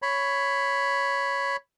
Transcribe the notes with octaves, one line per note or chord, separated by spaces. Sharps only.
C#5 B5